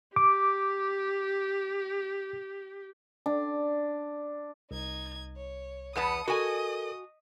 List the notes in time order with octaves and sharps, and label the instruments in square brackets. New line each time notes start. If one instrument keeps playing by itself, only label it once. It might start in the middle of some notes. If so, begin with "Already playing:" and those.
[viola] G4 [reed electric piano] D6
[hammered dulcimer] D4
[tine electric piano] C2 [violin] D#4 G#6
[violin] C#5
[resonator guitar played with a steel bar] E2 B3 A5 [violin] D#6 C#7
[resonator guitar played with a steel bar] F#4 G#5 [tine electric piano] A4 A#4 [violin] D#5 D#6